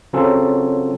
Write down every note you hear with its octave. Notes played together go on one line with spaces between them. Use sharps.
C#3 F#3 C4 C#4 F4 A4